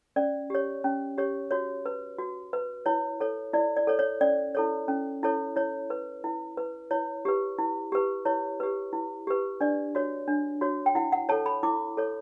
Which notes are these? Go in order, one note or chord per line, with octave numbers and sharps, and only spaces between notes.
C#4 D5
G4 C#5
C#4
G4 C#5
F#4 C#5
B4
F#4
B4
E4 C#5
A4 C#5
E4 D5
D5
A4 C#5
C#5
C#4 D5
E4 A4 C#5
C#4
E4 A4 C#5
E4 C#5
B4
E4
B4
E4 C#5
G4 B4
E4
G4 B4
E4 C#5
G4 B4
E4
G4 B4
D4 D5
F#4 C#5
D4
F#4 C#5
G5
E4 F#5
F#5
A4 C#5 A5
B5
E4 D6
A4 C#5